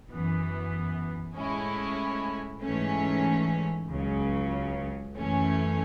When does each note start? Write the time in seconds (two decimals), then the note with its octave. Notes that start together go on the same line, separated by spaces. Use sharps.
0.10 F#2 E3 B3
1.36 A2 G#3 C#4 E4
2.63 G#2 E3 A3 C#4
3.89 C#2 C#3 F#3
5.16 F#2 E3 A3 C#4